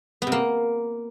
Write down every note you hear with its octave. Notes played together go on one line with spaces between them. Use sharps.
B3
C3
A#3